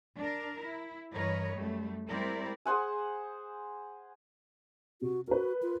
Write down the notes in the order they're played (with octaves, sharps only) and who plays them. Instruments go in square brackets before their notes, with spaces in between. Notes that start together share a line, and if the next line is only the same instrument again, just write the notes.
[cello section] D4 A#4
E4
G2 E3 A#4 B4 C#5 D#5
F#2 G3 A3
G3 G#3 C4 E4 A#4 D5
[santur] G#4 C5 F#5 G#5
[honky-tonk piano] C3 [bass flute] F#4
[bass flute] F#4 [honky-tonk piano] A#4 B4
[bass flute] F4